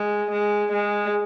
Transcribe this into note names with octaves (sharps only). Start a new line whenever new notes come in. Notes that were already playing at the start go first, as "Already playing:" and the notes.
Already playing: G#3
G#3
G#3